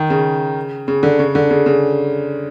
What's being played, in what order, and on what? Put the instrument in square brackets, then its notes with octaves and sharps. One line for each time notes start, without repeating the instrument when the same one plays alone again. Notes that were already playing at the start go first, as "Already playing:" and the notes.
Already playing: [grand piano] D#3
C#3
C#3
D3
C#3
D3
C#3
C#3